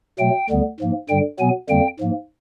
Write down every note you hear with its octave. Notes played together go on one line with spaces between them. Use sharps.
B2 F#3 A3 G5
D2 D3 G3 B3
G#2 F3 A#3
G2 D3 G3 G5
B2 F#3 B3 G#5
F2 D3 G3 A#3 G5
G#2 F3 A#3